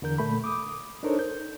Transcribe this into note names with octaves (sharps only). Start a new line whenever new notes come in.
E2 D3 A#4 G6
A#2 A3 B5
D6 D#6
D4 D#4 A4 A#4 C5 C#5
G6